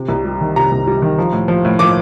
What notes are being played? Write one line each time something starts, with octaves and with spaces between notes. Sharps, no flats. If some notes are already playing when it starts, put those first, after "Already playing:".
Already playing: C3
C2
G3
D#3
C3 A#5
C2
G3
D#3
F3
A2
F3
A2
F3 D6